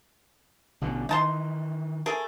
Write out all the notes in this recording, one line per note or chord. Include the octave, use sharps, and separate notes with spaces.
A1 B2 D3
D#3 E3 D#4 A5 C6
A3 G#4 A#4